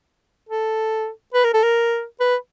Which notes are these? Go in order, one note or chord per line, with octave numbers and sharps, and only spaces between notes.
A4
B4
A#4
A4
A#4
B4